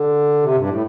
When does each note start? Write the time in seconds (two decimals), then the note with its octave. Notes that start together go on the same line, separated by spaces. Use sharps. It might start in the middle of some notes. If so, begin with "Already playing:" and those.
Already playing: D3
0.42 C3
0.55 G2
0.69 A2